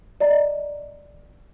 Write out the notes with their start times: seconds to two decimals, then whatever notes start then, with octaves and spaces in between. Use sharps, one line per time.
0.20 D5 D#5 A#5